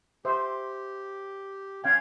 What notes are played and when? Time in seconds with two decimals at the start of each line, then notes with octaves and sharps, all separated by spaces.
0.25 G4 C5 E5
1.84 C#4 F5 G5 G#6